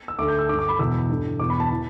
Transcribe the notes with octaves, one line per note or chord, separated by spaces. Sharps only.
E6
D2 D3 D6
G6
E6
G2 D3 D6
D6
B5
E2 B2 E6
G2 D3
E2 B2 D6
B5
A5
E3 A5